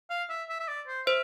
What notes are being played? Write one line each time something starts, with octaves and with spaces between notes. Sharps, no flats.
F5
E5
E5
E5
D5
C5
C5 E5